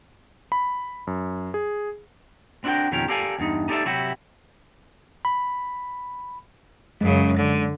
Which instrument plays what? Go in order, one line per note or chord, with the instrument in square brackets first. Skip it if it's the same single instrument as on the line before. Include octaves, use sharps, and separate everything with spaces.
[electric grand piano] B5
F#2
G#4
[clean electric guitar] C4 D4 E4 F#4 A#4 G5
F2 B2 D#3 C#4 G4 A#4
G4 A4 A#4 D5 F5 G#5
E2 G2 D#4
D#4 G4 A4 C#5 D5 E5
C3 F#3 E4 F#4 G4
[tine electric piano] B5
[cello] F#2 C#3 [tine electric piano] G#3
[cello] D3